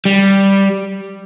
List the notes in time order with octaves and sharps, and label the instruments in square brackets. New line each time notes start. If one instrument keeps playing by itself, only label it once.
[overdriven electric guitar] G3